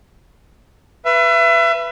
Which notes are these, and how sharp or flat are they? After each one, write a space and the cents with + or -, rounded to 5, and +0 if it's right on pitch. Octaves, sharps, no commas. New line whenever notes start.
B4 +0 E5 +35